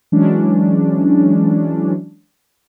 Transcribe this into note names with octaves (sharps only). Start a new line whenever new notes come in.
E3 F#3 G#3 C#4 D4